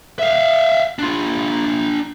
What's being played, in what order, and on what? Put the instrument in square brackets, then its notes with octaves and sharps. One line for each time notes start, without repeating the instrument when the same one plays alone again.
[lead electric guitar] E5 F5
D4 F4